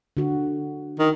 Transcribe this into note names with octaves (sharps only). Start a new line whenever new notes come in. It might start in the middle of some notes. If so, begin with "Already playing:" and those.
D3 F#4
D#3